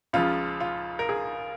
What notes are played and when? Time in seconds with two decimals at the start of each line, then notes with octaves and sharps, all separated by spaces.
0.13 C#2 C#3 F3 F4
0.61 F4
0.99 A#4
1.09 G#4